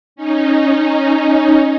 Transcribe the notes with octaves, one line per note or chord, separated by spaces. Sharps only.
C#4 D#4